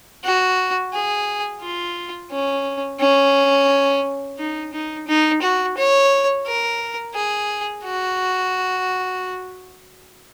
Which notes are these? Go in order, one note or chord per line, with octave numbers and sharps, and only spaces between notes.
F#4
G#4
F4
C#4
C#4
D#4
D#4
D#4
F#4
C#5
A#4
G#4
F#4